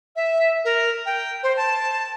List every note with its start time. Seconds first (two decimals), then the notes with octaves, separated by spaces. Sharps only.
0.16 E5
0.65 A#4
1.06 G5
1.43 C5
1.57 A5